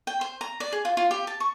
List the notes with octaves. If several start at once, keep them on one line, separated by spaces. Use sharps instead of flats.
G5
C5
A#5
D5
G#4
F4
F4
G4
A5
C#6